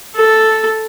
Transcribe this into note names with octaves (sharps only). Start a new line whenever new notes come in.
A4